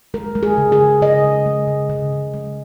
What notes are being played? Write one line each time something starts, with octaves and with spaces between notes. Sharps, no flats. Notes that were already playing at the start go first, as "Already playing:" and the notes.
G#3 A#4
G#3
G#4
C#3
G#4
C#3
C#3 D#5
G#3
G#3
C#3
C#3
C#3
G#3